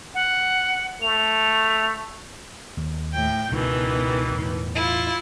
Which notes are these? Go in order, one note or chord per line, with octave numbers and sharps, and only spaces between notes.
F#5
A3 F7
D#2
A2 G5
C#2 G#2 B2 D#3 E3
E2 A2
E4 F4